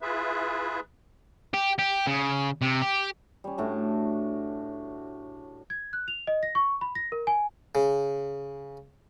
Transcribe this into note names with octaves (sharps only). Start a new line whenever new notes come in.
E4 F4 G#4 B4 E5
G4
G4
C#3
C3
G4
G3 C#4
A2 D4 F#4
G#6
F#6
F7
D#5
A#6
C#6
B5
A#6
A#4
G#5
C#3